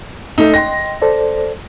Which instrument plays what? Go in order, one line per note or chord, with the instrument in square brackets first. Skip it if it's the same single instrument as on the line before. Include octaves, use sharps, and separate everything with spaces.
[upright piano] A3 D#4
[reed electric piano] D#5 G5 C6 [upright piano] A#6
[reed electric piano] A4 C5 D5